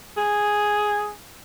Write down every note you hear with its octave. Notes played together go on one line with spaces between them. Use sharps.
G#4